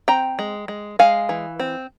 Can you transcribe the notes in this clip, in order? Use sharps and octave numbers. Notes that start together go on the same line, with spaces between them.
C4 G5 A#5
G#3
G#3
G#3 F5 G#5
E3
C4